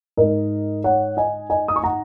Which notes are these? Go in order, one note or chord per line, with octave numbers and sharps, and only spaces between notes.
G#2 G#3 D#4 A#4 D#5
C#5 F#5
D#5 G#5
D#5 G#5
D#6
C#6
F#5 A#5